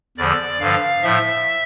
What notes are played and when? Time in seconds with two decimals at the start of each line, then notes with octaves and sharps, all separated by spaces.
0.17 E2 D3 F3 D5
0.60 G2 D3 F3 F5
1.03 A2 F3 E5